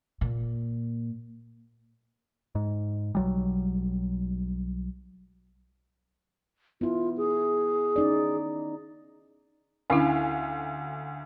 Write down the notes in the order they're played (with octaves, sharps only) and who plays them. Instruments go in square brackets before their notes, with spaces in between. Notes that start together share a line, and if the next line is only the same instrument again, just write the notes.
[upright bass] A#2
[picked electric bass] G#2
B1 F#3 G3
[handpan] B3 E4 [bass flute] F4
[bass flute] G#4
[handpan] C#4 D#4 D5
[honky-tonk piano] D2 F5 G#5 [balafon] C#4 D4 E4